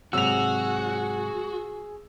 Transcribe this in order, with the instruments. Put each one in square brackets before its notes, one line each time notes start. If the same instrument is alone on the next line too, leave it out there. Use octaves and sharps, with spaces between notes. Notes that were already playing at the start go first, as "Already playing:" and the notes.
[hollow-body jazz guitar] G#2 C3 F#3 [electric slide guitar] F#4 [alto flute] G#4 [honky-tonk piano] E6 F7